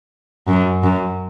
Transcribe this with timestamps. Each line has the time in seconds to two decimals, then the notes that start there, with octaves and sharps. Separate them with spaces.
0.48 F#2
0.83 F#2